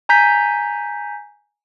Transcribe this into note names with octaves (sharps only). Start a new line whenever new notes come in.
G#5 A#5 G6 B6